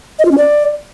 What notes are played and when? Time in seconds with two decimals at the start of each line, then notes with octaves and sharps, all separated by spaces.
0.19 D#5
0.25 F4
0.31 C#4
0.38 D5